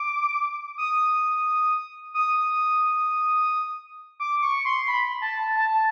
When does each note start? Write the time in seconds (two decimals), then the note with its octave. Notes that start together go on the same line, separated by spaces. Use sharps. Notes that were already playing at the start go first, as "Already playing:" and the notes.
Already playing: D6
0.78 D#6
2.14 D#6
4.20 D6
4.42 C#6
4.65 C6
4.88 B5
5.22 A5
5.56 A5